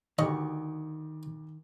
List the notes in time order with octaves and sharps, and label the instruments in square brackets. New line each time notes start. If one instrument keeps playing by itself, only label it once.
[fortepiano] D2 G4 C#6 [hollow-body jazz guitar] D#3 [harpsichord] D#5